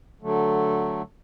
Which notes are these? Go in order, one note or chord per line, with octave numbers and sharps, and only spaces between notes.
D3 F#3 A3